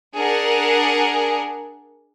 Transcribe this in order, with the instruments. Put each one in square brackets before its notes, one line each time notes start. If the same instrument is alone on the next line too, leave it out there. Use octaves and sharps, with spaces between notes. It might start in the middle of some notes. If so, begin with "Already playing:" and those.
[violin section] D4 G#4 A#4 F#5